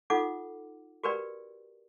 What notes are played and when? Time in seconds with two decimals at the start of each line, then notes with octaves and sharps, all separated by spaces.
0.10 D#4 F4 A4 F#5 D6
1.04 F#4 G4 A#4 B4 D5 G5